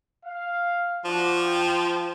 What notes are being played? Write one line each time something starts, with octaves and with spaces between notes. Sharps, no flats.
F5
F3 D4 F#4 D5
G5